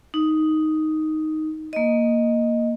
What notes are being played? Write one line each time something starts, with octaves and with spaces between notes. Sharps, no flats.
D#4
A#3 D#5